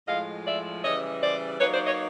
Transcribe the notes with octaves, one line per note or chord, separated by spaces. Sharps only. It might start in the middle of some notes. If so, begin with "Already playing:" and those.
A2 F3 G#3 D#5 F5
D5 E5
C#3 E3 G3 C#5 D#5
C5 D5
F#3 A#3 D#4 B4 C#5
C5 D5
C#5 D#5